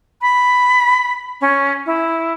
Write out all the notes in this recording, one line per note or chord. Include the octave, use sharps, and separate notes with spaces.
B5
C#4
E4